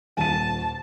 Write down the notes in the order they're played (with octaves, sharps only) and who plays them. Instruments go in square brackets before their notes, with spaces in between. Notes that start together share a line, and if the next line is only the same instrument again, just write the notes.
[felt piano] D#1 D#7 [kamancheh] A5